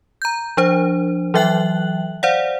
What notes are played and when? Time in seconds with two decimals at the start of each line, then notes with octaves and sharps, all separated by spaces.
0.22 A#5 G6
0.57 F3 D4 C5
1.34 E3 F#3 E5 G5 F#6 F#7
2.23 C5 D5 F5 F#5